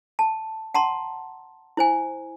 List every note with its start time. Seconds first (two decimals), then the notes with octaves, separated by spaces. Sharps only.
0.19 A5
0.74 F#5 A5 A#5 C6
1.77 E4 C5 G#5